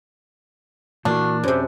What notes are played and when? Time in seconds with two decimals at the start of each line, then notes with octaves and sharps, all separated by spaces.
1.05 A#2 E3 A#3 D4 F#4
1.43 F#2 C3 C5